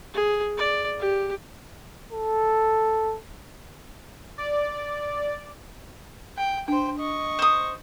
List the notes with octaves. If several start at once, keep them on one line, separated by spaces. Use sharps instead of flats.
G#4
D5
G4
A4
D5
G5
D4 C5 G5
D#5 C#6
C5 D#6